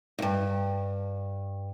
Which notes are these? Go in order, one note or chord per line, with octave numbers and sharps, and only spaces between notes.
D2 G2